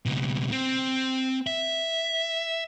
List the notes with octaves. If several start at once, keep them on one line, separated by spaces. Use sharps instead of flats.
C#2 B2
C4
E5